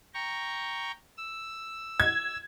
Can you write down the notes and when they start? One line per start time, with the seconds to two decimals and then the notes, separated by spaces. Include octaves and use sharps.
0.14 G5 A#5 C#6
1.17 E6
2.00 G#6